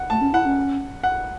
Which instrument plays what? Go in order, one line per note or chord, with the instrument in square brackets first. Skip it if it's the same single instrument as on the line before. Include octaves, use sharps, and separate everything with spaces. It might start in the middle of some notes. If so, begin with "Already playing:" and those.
Already playing: [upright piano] F#5
[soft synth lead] A3 [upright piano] A5
[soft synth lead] C#4
[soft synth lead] E4 [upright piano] F#5
[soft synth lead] C#4
[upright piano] F#5